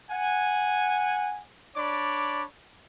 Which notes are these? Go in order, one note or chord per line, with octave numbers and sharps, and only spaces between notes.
F#5 G#5
D4 C#5 D5 B5 D6